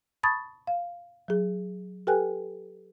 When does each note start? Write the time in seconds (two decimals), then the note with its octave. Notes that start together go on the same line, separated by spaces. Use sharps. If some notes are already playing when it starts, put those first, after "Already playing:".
0.23 A5 B5 C#6 D#6 G#6 A6
0.67 F5
1.28 F#3 G#4
2.07 G4 A4 B4 G5 G#5 F#6